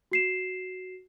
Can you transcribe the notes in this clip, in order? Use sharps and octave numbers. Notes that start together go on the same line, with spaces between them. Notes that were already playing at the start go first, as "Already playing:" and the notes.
F#4 C7 E7